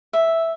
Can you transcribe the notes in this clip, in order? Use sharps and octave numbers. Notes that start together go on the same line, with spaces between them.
E5